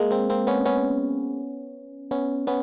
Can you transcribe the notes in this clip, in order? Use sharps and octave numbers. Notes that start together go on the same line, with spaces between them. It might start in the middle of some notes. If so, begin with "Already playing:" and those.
Already playing: G#3 A#3
A#3 C4
A#3 C4
B3 C#4
B3 C#4
B3 C#4
B3 C#4